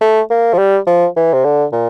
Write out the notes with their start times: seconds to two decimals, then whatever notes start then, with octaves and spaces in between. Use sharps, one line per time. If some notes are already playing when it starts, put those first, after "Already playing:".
0.01 A3
0.31 A#3
0.53 F3
0.58 G3
0.87 F3
1.16 E3
1.33 C3
1.44 D3
1.73 A#2